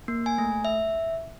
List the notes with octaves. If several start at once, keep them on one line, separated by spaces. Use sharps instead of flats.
A#3
G#5
A3
E5